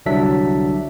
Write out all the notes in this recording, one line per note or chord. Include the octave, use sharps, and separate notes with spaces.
C2 D3 F#3 D4 E5 B6